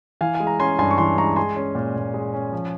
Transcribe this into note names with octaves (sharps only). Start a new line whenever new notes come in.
E3 F5 G#5
G#5
G#3
A#5
C#4 G#5 C6
G2 G#5 C6
C#6
E3 G#5 C6
G#3 A#5 C#6
G#3 G#5 C6
C#4
A#2
A#2
G#3
C#4
F3